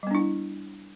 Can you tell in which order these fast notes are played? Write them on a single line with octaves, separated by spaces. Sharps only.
G3 B3 D4 E4